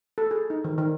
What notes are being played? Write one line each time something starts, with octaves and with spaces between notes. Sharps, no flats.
A4
G#4
D#4
D#3
D#3